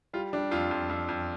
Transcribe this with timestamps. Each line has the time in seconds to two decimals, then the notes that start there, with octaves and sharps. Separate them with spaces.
0.13 G3 F4
0.33 G3 D4
0.51 F2 F4
0.71 F2
0.89 F2
1.09 F2